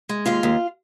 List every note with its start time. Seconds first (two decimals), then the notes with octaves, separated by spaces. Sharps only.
0.09 G#3
0.26 D#2 F4 F5
0.43 D#2